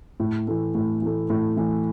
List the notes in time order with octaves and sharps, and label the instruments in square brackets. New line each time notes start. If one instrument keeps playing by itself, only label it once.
[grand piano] A2
E3 A3
A2
E3 A3
A2
E3 A3